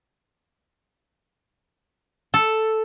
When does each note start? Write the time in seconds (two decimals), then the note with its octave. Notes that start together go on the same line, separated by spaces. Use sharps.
2.34 A4